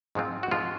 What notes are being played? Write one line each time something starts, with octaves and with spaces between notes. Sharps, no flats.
G#2 F3 G#3 C4 F4
F#4
G#2 F3 G#3 C4 F4